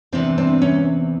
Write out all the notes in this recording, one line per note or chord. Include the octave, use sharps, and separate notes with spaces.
E2 C3 E3 C4 D4
C4 D4
B3 C#4